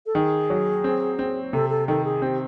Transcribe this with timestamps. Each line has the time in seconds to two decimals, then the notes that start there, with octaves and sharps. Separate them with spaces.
0.06 A4
0.15 D#3 G#4
0.50 F#3
0.84 C4
1.19 C4
1.53 C3 A4
1.70 A4
1.88 D#3 A4
2.05 G#4
2.22 C4 G4